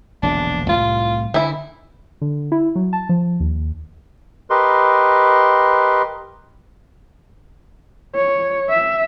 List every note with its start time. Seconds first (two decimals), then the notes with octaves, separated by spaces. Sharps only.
0.23 E1 A#1 D3 D4
0.69 C2 A2 G3 F4
1.34 D3 E3 E4
2.22 D3
2.52 E4
2.76 F#3
2.93 A5
3.09 F3
3.40 D#2
4.50 G4 A#4 B4 D#5 C6
8.15 C#5
8.69 E5